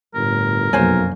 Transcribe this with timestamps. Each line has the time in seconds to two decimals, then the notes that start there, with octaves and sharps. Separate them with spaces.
0.15 G1 A2 A#4
0.73 F1 B1 F#2 A#3 C5 C#5 G#5